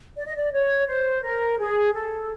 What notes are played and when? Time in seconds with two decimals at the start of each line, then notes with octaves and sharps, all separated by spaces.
0.17 D5
0.26 D#5
0.35 D5
0.52 C#5
0.88 C5
1.23 A#4
1.59 G#4
1.94 A4